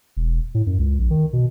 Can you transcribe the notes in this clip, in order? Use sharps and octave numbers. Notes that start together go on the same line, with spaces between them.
E1
A2
F#2
C#2
A#1
D#3
B2